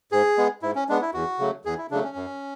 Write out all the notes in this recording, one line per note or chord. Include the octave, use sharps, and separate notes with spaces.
G#2 G#4
G#3 B3
G#2 E4
C#4
G#3 B3 D4
E4
E2 F#4
C#3 F#3 A3
E2 G#4
E4
C#3 F#3 A3 D4
C#4
F#2